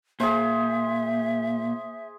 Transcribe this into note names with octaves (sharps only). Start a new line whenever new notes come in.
A#2 G#4 C5 E5